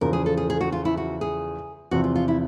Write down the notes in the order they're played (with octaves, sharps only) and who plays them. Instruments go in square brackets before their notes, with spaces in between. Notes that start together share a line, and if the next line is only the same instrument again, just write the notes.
[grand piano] E2 C#3 F3 [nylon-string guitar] A#4
[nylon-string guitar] G#4
A4
G#4
G#4
F#4
F4
E4
F#4
G#4
[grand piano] E2 C3 F3 [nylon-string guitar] F#4
[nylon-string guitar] F4
F4
E4